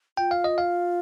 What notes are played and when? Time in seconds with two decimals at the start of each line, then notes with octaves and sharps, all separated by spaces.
0.17 F4 G5
0.31 F5
0.44 D#5
0.58 F5